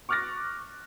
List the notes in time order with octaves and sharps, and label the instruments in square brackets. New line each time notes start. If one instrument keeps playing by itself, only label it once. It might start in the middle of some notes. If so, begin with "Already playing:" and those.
[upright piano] C#6 D6 F6 F#6 A6 A#6